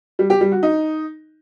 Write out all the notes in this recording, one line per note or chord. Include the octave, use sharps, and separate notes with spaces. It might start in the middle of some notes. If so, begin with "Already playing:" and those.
G3
G4
G3
F#4
D#4